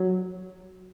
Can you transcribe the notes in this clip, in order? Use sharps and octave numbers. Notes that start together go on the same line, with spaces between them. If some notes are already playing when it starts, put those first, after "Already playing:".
Already playing: F#3